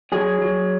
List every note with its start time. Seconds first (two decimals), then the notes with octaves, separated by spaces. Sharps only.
0.12 F#3 G#4
0.42 F#3